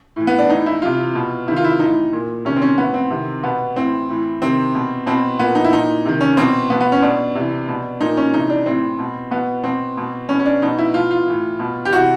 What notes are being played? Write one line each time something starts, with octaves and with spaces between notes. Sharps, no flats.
A2 E3
B3
D4
A2 E3 D#4
E4
C3 E3 F4
B2
C3 D#3 E4
F4
E4
A2 E3 D#4
A#2
C3 D#3 C#4
C4
C#4
A2 E3 B3
C4
C3 D#3
B2 B3
A2 E3 C4
A2 E3
C3 D#3 C4
B2
B2 C4
A#2 B3
D#4
E4
A#2 D#4
C3 D#3
C#4
B2 C4
B2 B3
B3
C#4
B2 D4
C3 E3
B2
A#2 D#4
C#4
C3 E3 D#4
D4
A2 E3 C4
B2
B2 B3
B2 C4
B2
B2 C#4
C#4
D4
B2 D#4
E4
B2 F4
F4
A2 E3
B2
G4
C3 E3 F#4